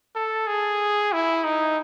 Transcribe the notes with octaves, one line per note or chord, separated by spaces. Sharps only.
A4
G#4
E4
D#4